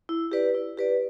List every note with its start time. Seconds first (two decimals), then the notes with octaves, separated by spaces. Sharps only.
0.09 E4
0.32 G4 B4 D5
0.55 E4
0.77 G4 B4 D5